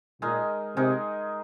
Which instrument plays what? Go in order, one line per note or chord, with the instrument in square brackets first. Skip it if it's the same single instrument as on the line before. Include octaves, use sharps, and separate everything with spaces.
[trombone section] A#2 [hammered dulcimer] G#3 D#4 A#4
[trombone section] C3 [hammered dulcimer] G#3 D#4 A#4